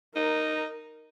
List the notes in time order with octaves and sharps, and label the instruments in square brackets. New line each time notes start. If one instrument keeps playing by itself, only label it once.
[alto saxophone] D#4 [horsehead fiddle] A#4